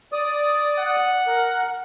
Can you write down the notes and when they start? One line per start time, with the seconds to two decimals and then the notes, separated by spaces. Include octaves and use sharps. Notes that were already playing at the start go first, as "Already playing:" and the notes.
0.12 D5 D#6
0.79 F#5
1.27 A#4